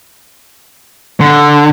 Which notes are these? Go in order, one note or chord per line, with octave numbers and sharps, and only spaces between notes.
D3